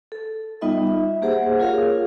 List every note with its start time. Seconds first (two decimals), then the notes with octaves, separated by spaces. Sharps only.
0.12 A4
0.61 G3 B3 D#4 F4 D#5 E5
0.87 E5
1.22 A#3 G4 G#4 C5 F#5
1.60 F4 G#4 A#4 C#5 F5